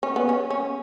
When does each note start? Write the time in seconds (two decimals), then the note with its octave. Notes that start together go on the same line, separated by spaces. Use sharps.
0.03 C#4
0.16 B3
0.29 C#4
0.50 C#4